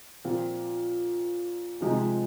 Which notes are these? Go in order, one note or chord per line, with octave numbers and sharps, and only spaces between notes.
A#2 F3 C4 F4
C3 F3 G#3 C4 D#4